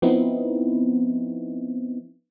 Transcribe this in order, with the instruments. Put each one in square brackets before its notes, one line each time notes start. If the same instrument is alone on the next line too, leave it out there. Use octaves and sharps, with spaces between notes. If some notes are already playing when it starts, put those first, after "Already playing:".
[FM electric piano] F3 B3 C4 D#4 E4